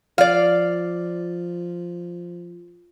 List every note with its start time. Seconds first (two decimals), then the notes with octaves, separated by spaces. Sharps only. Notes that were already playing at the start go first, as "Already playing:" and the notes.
0.18 F3 D5 F5